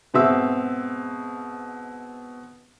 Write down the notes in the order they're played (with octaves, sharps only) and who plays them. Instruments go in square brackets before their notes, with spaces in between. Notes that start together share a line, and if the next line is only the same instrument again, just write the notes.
[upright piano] G#2 B2 C4 E5 E6